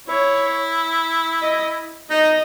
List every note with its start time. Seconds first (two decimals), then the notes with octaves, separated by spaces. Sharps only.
0.08 E4 C#5
1.43 D#5
2.10 D#4 D#5